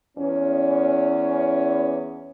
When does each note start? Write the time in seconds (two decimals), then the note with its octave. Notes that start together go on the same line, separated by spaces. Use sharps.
0.17 E2 C#4